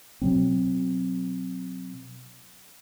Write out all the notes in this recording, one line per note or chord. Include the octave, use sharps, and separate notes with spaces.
B2 F#3 C4